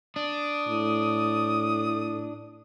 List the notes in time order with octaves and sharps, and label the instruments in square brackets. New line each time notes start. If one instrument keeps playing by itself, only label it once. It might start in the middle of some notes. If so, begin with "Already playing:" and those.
[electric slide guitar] D4 [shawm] D#6
[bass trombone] A2